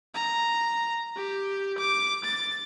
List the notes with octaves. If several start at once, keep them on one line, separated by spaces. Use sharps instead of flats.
A#5
G4
D6
A6